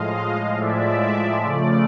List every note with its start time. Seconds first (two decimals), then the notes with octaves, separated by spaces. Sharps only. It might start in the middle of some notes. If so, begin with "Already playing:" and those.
Already playing: A2 F3 G#3 D#5 F5
0.59 A2 F3 G#3 D5 E5
1.43 C#3 F3 A3 D5